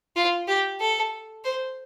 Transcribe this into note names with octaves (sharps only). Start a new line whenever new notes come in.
F4
G4
A4
C5